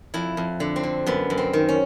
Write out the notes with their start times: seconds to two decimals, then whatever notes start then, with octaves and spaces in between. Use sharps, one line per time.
0.14 F2 E4
0.37 F2
0.60 D3
0.76 C4
0.83 D3
1.06 F#2 B3
1.30 F#2
1.38 C4
1.53 D#3
1.69 C#4